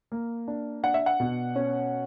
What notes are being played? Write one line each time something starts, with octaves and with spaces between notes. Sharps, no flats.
A#3
D4
D4 F#5
E5
F#5
B2
C#4